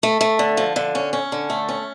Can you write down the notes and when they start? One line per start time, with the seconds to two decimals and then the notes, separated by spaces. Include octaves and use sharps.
0.03 A3
0.21 A3
0.39 D3
0.57 F3
0.76 D3
0.95 C#4
1.13 C#4
1.32 D3
1.50 A3
1.69 C#4